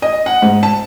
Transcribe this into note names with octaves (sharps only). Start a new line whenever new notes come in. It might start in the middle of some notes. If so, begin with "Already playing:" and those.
D#5
F#5
G#2
A5